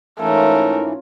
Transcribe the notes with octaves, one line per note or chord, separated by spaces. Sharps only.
G#2 E3 A3 C#4 F4 A#4 C#5